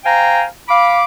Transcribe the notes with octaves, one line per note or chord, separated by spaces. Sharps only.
C5 F5 G5 G#5 A#5
F5 B5 D6